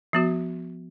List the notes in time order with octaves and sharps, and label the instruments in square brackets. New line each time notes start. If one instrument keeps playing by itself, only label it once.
[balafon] F3 B3 F#4